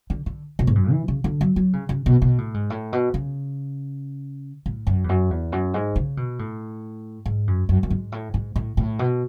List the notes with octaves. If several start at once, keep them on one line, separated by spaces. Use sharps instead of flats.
D3
D3
B2
G#2
F#2
E3
C#3
D3
F#3
F#3
C#3
C#3
B2
B2
A2
G#2
A2
B2
C#3
A2
F#2
E2
F#2
E2
F#2
G#2
C#3
B2
A2
G#2
F#2
F#2
F#2
G#2
A2
G#2
A2
A2
B2